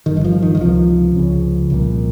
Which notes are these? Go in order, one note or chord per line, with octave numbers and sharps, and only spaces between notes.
G1 G2 D#3
D#3
F3
D#3
D#3
C#2 C3 F3
C#2 C#3
C2 A#2